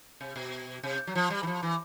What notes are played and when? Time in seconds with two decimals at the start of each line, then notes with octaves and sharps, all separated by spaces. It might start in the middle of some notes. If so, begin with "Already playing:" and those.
0.21 C3
0.36 B2
0.83 C3
1.07 F#3
1.15 F3
1.30 G3
1.43 E3
1.47 F3
1.63 E3